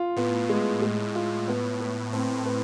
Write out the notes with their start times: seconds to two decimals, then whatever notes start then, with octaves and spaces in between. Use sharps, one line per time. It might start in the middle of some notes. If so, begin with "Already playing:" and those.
Already playing: F4
0.16 A2 B3
0.49 G#3
0.82 G#3
1.15 F4
1.48 B3
1.80 B4
2.13 A2 C4
2.45 B4